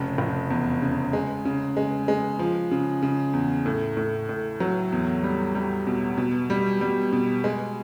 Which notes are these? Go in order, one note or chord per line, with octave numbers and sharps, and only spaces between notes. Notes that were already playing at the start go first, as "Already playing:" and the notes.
Already playing: F1 C#3
F1
E2
C#3
G#3
C#3
G#3
G#3
F3
C#3
C#3
E2
A2
A2
A2
F#3
E2
G3
G3
B2
B2
G3
G3
B2
G#3